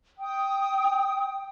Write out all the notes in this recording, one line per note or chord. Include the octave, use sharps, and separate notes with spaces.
G5 D#6